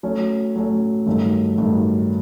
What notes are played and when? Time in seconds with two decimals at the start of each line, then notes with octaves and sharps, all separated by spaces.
0.03 F#3 A3 C#4
0.56 F#3 A3 C#4
1.06 G2 D#3 F#3 A3
1.58 G2 D#3 F#3 A3